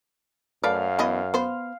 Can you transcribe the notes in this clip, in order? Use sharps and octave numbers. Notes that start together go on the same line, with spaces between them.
F#2 A3 B4 D5 F5
E3 B3 D#5
B3 C5